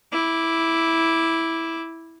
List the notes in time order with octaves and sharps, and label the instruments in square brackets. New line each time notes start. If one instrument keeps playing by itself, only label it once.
[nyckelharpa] E4 D6